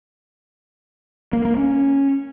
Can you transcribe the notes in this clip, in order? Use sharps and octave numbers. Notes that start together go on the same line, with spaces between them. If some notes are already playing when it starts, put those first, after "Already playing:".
A#3
A#3
C#4